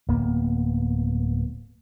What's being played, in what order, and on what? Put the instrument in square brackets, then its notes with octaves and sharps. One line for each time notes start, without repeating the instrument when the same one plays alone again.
[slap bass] D1 A#3 B3